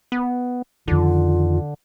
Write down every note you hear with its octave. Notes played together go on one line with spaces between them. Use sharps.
B3
F2 D3 D#3 F4